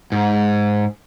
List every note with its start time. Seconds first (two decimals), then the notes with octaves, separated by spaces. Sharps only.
0.12 G#2